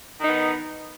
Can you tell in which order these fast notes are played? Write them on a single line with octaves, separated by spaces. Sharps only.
D#3 D#4 B3